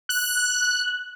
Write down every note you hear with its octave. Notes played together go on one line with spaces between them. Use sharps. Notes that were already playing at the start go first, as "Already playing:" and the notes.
F#6